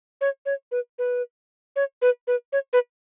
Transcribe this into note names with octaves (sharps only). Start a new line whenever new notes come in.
C#5
C#5
B4
B4
C#5
B4
B4
C#5
B4